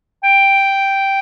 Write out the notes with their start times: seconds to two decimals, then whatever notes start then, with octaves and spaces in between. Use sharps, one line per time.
0.24 G5